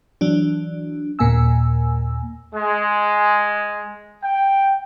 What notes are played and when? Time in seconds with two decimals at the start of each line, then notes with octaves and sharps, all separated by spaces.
0.21 E3 F#3 D4
1.19 D#2 A#2 A#3 G#5 E6
2.53 G#3
4.23 G5